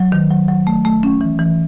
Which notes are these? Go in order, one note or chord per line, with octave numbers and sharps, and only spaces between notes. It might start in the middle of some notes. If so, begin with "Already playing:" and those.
Already playing: F#3
D#3
F#3
F#3
A3
A3
C#4
E3
E3